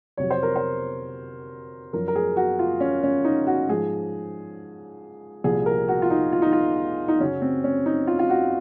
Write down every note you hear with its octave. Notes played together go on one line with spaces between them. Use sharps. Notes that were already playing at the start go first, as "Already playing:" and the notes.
F2 C3 F#3 C#5
C5
A#4
C5
F#2 F3 A#4
A#4
G#4
F#4
F4
C#4
C#4
D#4
F#4
G#2 F3 G#4
C2 A#2 F3 G#4
A#4
F#4
F4
D#4
F4
D#4
F4
D#4
F#2 C#3 F#3 C#4
C4
C#4
D#4
F4
F4
F#4